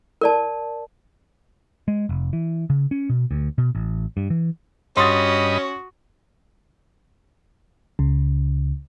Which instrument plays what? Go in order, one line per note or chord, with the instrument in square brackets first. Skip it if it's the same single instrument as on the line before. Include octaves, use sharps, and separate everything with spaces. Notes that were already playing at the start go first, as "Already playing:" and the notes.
[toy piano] A#4 D5 A5
[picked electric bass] G#3
F1
E3
C#3
C#4
B2
D2
B2
A1
G2
E3
[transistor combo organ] G2 D#5 B5 [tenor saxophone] C#4 [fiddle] F#4 [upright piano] C6 D#6 A6
[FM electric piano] C#2 C#3